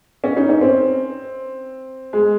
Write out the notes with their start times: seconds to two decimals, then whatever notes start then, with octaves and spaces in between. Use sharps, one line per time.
0.24 C#4
0.37 D#4
0.49 C#4
0.61 C4
2.13 G#3